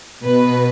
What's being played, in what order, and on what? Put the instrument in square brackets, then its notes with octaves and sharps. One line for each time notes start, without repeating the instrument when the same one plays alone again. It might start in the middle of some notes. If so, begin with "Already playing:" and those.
[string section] B2 B4